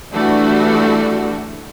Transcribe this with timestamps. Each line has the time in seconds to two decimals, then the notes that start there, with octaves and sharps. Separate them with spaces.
0.13 E3 G3 A3 D4 F#4